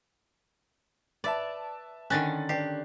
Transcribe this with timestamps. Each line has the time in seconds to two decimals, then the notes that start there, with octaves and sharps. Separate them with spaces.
1.24 B4 D5 E5 A5
2.10 D3 D#3 C#4 F#6 A6
2.49 D4 G4 C7